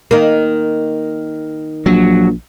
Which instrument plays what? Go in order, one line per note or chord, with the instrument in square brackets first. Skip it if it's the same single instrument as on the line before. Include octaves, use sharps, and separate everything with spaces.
[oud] D#3 A#3
[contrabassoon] A#1 [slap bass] F#3